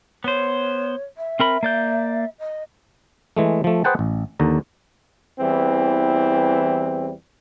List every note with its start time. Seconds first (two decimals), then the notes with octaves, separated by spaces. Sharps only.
0.24 B3 C5 C#5
1.17 E5
1.40 C4 A#4 B5
1.63 A#3 D5 G6
2.39 D#5
3.37 E3 G#3 A3
3.64 F3 A3
3.84 G#4 B4 C5 F#5 G5 A5
3.99 A1
4.39 D#2 D3 A#5
5.40 E2 E3 G3 C4